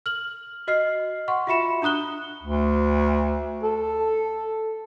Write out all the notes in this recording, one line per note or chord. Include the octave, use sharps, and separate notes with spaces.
F6 F#7
F#4 D#5 F6 C7
F#5 C6 C#6
F4 F#4 E5 B5 C#7 E7
D4 A#5 D#6 F#6 G7
D2
A4